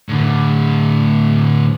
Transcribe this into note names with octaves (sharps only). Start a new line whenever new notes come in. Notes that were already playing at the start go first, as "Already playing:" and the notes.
A2 D3